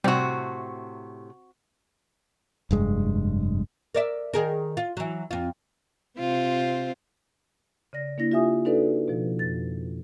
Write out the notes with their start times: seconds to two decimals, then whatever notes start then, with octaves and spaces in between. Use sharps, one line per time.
0.04 A2 C3 G3 C4 F#4
2.71 F1 G2 G#3
3.95 A#4 D5 E5
4.34 D#3 G#4 A#4
4.77 F4
4.97 E3 F#3
5.31 F2 F4
6.18 C3 C4 F4
7.93 C#3 D5 A#6
8.18 A#3 D4 E4 A#6
8.32 F4 G4 E5 G#5 D#6
8.65 D4 D#4 F#4 A4 B4 D5
9.08 B2 F3
9.39 F2 A6